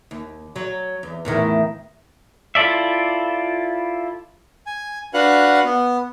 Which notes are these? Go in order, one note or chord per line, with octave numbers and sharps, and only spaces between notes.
D#2
F#3
E2
E2 A2 D#3
E4 F4 A4 D5 E5
G#5
D4 F#4 B4 F5 F#5 F#6
B3